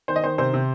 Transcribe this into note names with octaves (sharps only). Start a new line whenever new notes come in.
D#3 C5
D#5
D#3 C5
C3 C5
C3